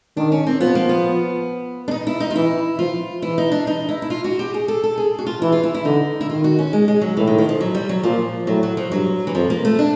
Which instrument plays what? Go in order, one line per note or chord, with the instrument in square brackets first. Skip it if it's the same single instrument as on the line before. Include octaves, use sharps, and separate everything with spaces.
[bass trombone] D#3 [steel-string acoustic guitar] D4
[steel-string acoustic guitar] C#4
C4
[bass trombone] F3 [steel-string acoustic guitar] B3
[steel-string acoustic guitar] A#3
B3
D4
D#4
E4
D#4
F4
[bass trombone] E3 [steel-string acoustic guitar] E4
[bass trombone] F3 [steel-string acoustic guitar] F4
[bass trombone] E3 [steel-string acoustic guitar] E4
[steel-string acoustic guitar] D#4
D4
D#4
E4
E4
F4
F#4
G4
G#4
A4
A4
G#4
F#4
F4
[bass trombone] E3 [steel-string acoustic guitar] E4
[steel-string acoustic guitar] F4
E4
E4
[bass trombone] D3 [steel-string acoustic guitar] D#4
[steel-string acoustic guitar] E4
[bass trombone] D#3 [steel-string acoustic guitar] F4
[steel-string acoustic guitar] F#4
C#4
G#3
G#3
F#3
[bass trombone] A2 [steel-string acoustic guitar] E3
[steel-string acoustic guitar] D#3
D#3
F3
F#3
G3
F#3
[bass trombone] A#2 [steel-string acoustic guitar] F3
[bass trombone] A2 [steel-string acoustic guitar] F#3
[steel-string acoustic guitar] F#3
F3
[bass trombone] G2 [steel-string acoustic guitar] F#3
[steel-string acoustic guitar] E3
[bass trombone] F2 [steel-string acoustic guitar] F3
[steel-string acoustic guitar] A#3
A3
D4